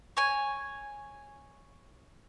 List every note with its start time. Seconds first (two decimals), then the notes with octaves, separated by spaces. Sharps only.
0.17 C#5 G#5